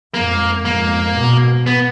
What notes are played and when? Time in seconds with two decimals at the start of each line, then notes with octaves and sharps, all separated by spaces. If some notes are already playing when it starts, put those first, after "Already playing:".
0.14 F2 G#2 A#3
0.65 F2 G#2 A#3
1.15 G#2 B2
1.66 B3